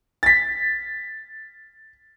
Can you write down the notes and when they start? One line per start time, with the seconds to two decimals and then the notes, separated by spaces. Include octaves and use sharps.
0.23 A6 B6